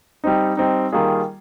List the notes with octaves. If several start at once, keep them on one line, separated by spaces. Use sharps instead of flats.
G3 C4 D#4
G3 C4 D#4
D#3 G3 A#3 F4 G#4